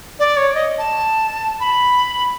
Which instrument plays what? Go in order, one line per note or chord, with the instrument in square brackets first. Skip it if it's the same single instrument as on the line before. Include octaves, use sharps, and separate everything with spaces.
[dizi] D5
C#5
D#5
A5
B5